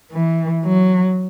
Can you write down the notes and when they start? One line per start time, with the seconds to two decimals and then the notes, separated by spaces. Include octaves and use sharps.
0.12 E3
0.65 F#3